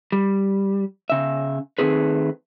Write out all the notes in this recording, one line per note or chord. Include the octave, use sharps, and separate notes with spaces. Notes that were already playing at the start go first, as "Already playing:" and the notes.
G3
C#3 E5
D#3 F3 A3 C4 G#4 B4